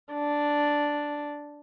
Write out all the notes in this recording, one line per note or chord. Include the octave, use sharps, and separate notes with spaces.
D4